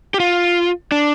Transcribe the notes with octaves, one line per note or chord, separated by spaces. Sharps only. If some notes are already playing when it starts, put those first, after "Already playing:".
G4
F4
D4